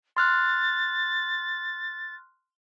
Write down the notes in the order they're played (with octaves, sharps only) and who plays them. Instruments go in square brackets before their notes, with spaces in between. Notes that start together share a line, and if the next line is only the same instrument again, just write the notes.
[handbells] C6 F6 F#6 [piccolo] A6